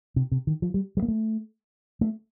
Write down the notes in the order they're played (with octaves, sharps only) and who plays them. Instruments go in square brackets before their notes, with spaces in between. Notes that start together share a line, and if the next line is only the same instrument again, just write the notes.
[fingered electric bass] C3
C3
D#3
F3
G3
G3
A#3
A3
A3